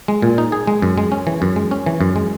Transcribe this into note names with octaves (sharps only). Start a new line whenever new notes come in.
G#3
A#2
D#4
G#4
G#3
F#2
G#3
C#4
E3
F#2
G#3
C#4
E3
F#2
G#3